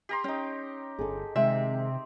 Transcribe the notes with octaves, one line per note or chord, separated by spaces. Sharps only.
G4 A#5 C6
C#4 D#4 G5
G1 G#4 A4
C3 D#3 G#3 C4 E5